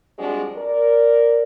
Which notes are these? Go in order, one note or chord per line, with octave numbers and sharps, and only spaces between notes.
F3 G3 G#3 C4 D4 F#4
A#4 D5